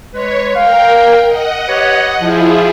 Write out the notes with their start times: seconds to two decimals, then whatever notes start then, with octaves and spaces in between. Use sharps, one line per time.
0.13 G#3 B4 C#5
0.55 A#4 F5 G5
1.27 D#5 F#5
1.67 G4 B4 C#5
2.19 F3 E4 F4 G#4